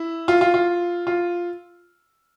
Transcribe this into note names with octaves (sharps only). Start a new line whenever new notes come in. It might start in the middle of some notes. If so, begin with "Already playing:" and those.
Already playing: E4
F4
F4
F4
F4